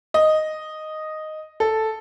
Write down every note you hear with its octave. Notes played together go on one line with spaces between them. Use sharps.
D#5
A4